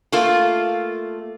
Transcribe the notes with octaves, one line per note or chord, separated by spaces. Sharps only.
A3 A#3 F4